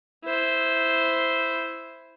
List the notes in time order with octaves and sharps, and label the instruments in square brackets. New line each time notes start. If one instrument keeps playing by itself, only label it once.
[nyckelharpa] E4 C5